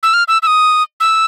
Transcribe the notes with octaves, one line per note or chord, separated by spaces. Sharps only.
E6
F6
E6
E6
D#6
E6